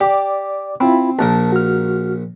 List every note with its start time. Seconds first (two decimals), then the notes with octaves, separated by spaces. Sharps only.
0.01 G4 D5 D6
0.80 C4 E4 F4 B5
1.19 A#1 A#2 A#4 A5
1.52 F#4 F6